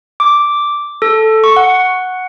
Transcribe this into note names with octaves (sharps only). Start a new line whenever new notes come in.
D6
A4
C#6
F#5